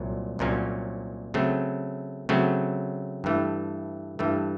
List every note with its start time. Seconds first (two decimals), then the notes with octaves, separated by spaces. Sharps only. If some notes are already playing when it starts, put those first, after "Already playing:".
Already playing: C2 A#2 F#3
0.39 C2 A#2 F#3 A#3 C#4
1.34 C#3 F#3 A3 C4
2.29 C#3 F#3 A3 C4
3.24 G2 E3 A3
4.19 G2 E3 A3